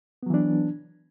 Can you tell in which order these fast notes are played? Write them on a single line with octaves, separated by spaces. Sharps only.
B3 F#3 E3 D4